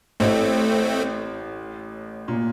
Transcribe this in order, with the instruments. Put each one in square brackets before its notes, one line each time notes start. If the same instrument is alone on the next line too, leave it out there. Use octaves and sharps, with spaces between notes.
[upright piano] A1 A2 [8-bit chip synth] A3 C4
[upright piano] A#2